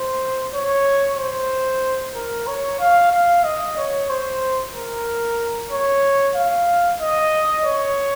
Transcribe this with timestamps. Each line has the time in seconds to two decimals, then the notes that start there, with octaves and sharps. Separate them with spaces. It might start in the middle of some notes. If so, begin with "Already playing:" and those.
Already playing: C5
0.53 C#5
1.18 C5
2.15 A#4
2.47 C#5
2.80 F5
3.12 F5
3.44 D#5
3.77 C#5
4.10 C5
4.74 A#4
5.71 C#5
6.35 F5
7.01 D#5
7.65 C#5